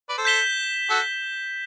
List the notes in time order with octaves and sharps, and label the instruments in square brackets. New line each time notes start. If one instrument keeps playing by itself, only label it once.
[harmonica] B4 D5
A4 C5
[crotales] G6 B6 E7 G7
[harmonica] F#4 A4